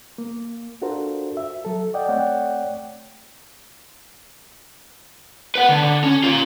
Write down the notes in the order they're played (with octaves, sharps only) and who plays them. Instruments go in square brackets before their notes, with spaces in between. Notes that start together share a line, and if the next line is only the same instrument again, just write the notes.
[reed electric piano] A#3
D4 F4 F#4 A4 A#4 C5
E5
F#3 A4
D5 D#5 F#5 G5
A3 C4 C#5 D5 F#5 G5
[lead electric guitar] B4 F#5
D3
D3
C#4
F4 A#4